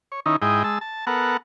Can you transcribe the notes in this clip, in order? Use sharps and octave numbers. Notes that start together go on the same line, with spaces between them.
C#5
D#3 C#4 D#4 E4
G#2 E4 G#4 D#5 G5
G#3 A5 E6
A5
B3 A4 A#4 F#5